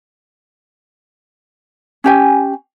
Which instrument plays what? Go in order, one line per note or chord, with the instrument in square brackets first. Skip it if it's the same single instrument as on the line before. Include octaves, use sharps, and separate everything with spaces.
[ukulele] C#4 G4 G#5